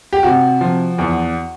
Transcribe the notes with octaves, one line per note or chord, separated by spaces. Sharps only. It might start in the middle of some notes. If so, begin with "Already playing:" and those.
G4
C3 F#4
F3
E2